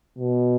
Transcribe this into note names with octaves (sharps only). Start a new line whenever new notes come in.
B2